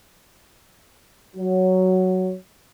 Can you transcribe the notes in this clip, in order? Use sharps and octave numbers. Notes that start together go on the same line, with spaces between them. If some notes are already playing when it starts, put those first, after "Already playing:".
F#3